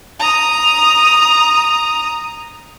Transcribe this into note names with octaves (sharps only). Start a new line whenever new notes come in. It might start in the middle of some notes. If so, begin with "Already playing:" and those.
A#5 D#6